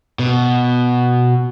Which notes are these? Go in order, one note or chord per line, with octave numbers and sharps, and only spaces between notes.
B2